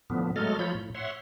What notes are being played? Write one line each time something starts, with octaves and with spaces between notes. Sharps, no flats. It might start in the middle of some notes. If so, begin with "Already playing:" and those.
A2 D3 F3 B3
F#3 G#3 A3 A4 D#5 F6
F3 F4 C#5 B5 G6
A2
C#5 E5 F#5 C6